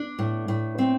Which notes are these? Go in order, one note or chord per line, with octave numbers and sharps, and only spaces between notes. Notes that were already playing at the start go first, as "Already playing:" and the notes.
Already playing: D4
A2
A2
C4